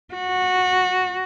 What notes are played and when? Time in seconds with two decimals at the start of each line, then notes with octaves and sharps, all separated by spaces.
0.14 F#4